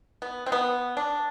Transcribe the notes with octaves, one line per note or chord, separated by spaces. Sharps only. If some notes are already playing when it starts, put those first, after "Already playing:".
B3
C4
B3
D4